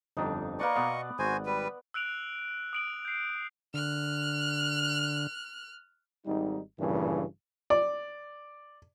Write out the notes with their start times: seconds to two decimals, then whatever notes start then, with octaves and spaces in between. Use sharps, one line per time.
0.17 G1 F2 D4 D#4
0.59 A#3 B4 D5 D#5 C#6
0.76 B2 B3 D5 F5
1.19 G#1 F#4 C5 G#5
1.46 G3 B4
1.94 E6 F#6 D7 F7 F#7
2.73 D#6 D7 F#7
3.05 G6 C7
3.74 D3 F6 F#6
6.26 G#1 G3 D#4
6.80 G#1 G2 A#2 C#3 E3
7.70 D5